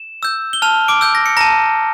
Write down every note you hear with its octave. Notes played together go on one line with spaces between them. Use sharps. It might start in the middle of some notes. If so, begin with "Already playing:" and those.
Already playing: E7
E6 G6
G7
A5 F6 F7
D6 D7
E6 G6
A#6
C#7
A5 A#5 A#6